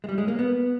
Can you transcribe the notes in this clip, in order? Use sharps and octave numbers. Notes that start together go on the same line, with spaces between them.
G#3
G3
G#3
A#3
B3